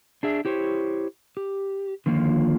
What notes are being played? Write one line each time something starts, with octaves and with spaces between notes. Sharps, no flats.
D4 G#4 E5
E4 G4 C5 C#5
G4
D3 D#3 F3 A#3 F4